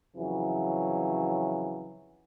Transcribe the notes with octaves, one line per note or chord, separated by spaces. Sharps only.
F2 C#3 E3 F#3